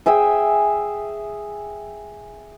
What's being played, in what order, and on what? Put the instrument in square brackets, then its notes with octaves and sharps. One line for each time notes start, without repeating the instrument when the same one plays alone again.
[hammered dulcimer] G#4 E5 G5 G#5